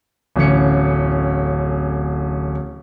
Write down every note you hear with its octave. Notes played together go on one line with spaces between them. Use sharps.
D1 A1 C#4 C#7